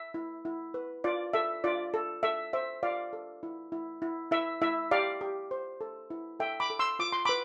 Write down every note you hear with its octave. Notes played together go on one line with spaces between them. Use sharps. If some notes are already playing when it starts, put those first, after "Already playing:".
Already playing: E5
E4
E4
B4
F4 D5
A4 E5
F4 D5
A4
A4 E5
C5 E5
F4 D5 F5
A4
E4
E4
E4
E4 E5
E4 E5
G4 D5 F5
G4
C5
A4
E4
A4 E5 G5
B5 D6
A4
C6 E6
F4 D6
C6
B4 B5 D6